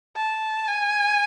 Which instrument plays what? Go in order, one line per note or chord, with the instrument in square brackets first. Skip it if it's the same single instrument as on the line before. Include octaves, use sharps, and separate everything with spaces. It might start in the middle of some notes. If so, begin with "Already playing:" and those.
[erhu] A5
G#5